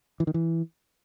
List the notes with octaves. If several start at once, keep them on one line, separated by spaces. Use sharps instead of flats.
E3
D#3
E3